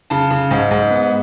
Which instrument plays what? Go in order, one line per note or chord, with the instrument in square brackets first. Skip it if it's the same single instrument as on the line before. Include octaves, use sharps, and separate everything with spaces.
[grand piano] C#3 A5
C#3
G#2
G#2
B3